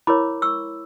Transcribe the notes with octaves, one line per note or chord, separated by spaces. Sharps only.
E4 A#4 C#5 B5 D6
C#6 E6